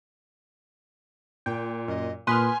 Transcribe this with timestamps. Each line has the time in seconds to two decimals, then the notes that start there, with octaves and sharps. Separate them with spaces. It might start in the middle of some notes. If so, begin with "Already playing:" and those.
1.46 A#2 G5
1.88 F#2 D#5
2.27 A#2 B4 G#5 C6 D#6 F6